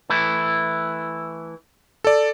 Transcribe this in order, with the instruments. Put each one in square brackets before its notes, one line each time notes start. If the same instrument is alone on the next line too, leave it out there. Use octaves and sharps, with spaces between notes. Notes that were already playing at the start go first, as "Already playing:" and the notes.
[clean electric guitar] E3 A3 E4
[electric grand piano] A4 D5